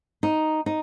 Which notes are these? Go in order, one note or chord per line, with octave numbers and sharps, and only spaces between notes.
D#4
D#4